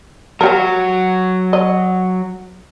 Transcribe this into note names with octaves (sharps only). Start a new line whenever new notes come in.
F#3 F#4 G4 A#4
D#5